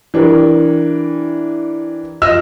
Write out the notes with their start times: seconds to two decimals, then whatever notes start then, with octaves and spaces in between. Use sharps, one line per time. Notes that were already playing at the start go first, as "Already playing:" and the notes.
0.14 E3 D4 G4 A#4
2.22 F4 D#5 E6 F6